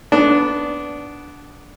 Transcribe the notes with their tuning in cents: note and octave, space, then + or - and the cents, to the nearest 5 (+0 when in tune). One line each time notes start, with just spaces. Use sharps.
B3 +0 D4 -15